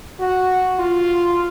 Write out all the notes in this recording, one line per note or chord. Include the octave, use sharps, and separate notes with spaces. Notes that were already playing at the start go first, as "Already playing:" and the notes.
F#4
F4